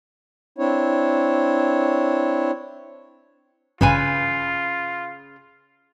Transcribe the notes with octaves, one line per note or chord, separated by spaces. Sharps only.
C4 D4 E4 C#5
A1 G2 C#3 F4 B4 G#5